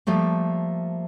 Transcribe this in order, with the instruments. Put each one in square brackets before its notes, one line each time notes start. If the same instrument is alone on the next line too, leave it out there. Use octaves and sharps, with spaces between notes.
[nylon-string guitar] F3 G3 A3 A#3